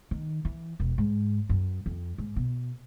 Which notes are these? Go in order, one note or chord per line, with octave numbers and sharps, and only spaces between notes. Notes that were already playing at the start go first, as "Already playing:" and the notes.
D#3
E3
E1
G#2
F#2
F2
G#2
B2